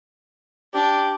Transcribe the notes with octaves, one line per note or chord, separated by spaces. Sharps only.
D4 G4